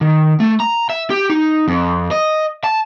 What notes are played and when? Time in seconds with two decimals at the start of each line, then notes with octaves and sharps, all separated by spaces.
0.01 D#3
0.40 A3
0.60 A#5
0.90 E5
1.10 G4
1.30 D#4
1.68 F2
2.11 D#5
2.64 A5